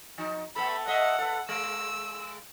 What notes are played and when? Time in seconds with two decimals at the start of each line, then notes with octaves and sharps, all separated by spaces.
0.18 F3 D#4
0.56 A3 B3 A4 B5
0.87 A3 D#5 E5 F#5
1.19 A4 B4
1.49 G#3 E6